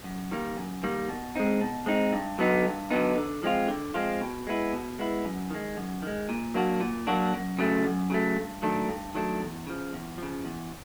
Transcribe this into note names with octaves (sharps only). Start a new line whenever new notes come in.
F#2
D#3 G3 A#3
F#2
D#3 G3 A#3
B2
G#3 C4 D#4
B2
G#3 C4 D#4
G2
D3 F#3 B3 D#4
G2
D3 F#3 B3 D#4
D3
F3 G#3 C4 F4
D3
F3 G#3 C4 F4
B2
G#3 B3 E4
B2
G#3 B3 E4
F#2
D#3 G#3
F#2
D#3 G#3
A#2
F#3 A#3 D4 F#4
A#2
F#3 A#3 D4 F#4
F#2
C#3 F#3 A3
F#2
C#3 F#3 A3
G2
D#3 F#3 A3 D4
G2
D#3 F#3 A3 D4
E2
C#3 F3
E2
C#3 F3
E2